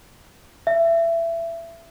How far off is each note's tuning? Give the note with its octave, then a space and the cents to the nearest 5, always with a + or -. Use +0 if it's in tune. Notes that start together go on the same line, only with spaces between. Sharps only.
E5 +25